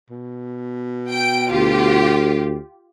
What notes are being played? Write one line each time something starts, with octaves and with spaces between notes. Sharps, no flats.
B2
G5 D7
D2 F4 G4